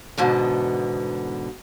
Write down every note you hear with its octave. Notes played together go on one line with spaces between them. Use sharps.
E2 G#2 B2 D3